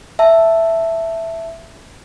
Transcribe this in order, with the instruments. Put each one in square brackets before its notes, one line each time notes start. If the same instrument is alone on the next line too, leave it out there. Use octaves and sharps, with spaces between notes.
[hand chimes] E5 A5